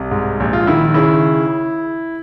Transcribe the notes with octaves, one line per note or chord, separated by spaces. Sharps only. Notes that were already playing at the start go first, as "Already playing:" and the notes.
Already playing: C2
G#2
A#1
F4
D#3 E4
C#3 E4